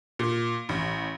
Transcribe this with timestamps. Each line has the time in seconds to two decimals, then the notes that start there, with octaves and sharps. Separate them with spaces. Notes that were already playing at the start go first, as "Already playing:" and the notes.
0.19 A#2
0.69 A1